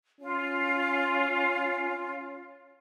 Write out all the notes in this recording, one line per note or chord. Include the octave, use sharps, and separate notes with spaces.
C#4 F4